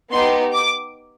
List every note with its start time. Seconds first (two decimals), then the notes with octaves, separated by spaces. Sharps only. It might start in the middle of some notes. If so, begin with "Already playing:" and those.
0.12 B3 D#4 G4 C6
0.54 D6